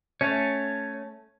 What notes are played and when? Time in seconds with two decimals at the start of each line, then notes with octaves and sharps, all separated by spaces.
0.21 A3 C#4 C#5 A5